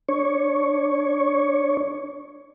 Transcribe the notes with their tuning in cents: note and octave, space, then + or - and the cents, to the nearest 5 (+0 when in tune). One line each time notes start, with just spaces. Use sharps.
D4 +0 C#5 +0